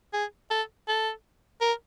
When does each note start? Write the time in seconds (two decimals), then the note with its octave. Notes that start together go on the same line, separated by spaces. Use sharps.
0.13 G#4
0.50 A4
0.88 A4
1.61 A#4